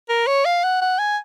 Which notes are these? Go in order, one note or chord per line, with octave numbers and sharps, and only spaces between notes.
A#4
C#5
F5
F#5
F#5
G#5